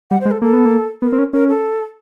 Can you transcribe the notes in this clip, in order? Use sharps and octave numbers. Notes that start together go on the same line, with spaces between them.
G3 F#5
C5
G#3
A4
A#3 A4
B3
A#3
B3 A#4
C4
C#4
C#4 A#4
A4